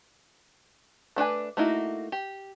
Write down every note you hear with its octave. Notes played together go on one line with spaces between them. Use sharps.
A3 D4 B4 G#5
A3 A#3 D#4 E4 F#4
G4